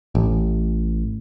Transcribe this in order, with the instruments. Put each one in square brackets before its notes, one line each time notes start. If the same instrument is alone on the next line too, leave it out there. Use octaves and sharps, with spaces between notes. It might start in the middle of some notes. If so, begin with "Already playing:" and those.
[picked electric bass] A1